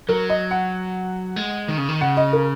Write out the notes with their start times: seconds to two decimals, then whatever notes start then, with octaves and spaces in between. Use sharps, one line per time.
0.09 F#3 A#4
0.29 D#5
0.51 F#5
1.36 G#3
1.69 D#3
1.78 C#3
1.89 D#3
2.01 C#3 F#5
2.17 D#5
2.33 A#4